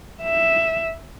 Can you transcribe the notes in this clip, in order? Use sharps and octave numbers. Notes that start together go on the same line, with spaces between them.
E5